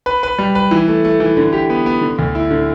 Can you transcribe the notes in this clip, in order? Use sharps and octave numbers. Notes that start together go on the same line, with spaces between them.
B4
B4
G3
B4
E3
A3
A3
E3
D3
G4
B3
B3
D3
D2
E4
D3